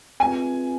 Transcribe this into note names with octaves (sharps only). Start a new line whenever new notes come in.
C4 F4 G#4 B4 E5 G#5